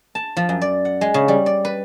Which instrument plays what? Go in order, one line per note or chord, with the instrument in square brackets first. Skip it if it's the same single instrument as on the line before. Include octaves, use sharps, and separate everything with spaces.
[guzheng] A5
F3
F#2
D5
F#5
G#3
C#3
G3
D5
B4